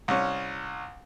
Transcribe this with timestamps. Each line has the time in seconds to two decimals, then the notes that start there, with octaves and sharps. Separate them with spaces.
0.08 C2 C#4